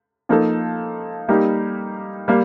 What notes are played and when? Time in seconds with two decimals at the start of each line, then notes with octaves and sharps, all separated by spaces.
0.29 F3 A#3 D#4 A4
1.29 G3 A#3 D#4 G4
2.28 G3 A#3